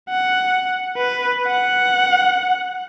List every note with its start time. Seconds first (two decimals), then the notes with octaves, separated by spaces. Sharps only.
0.10 F#5
0.98 B4
1.47 F#5